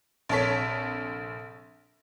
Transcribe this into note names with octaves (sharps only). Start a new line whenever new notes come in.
A#1 C3 A4 C#5 B6